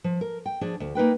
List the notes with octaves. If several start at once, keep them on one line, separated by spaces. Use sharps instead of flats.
F3
A#4
G5
F3 D4 G#4
D2
A#3 D#4 B4 G5